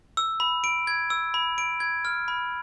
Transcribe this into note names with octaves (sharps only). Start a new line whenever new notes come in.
E6
B5
D7
G#6
E6
B5
D7
G#6
F6
B5